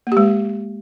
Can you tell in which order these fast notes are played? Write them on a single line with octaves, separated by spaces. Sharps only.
A#3 G4 G#3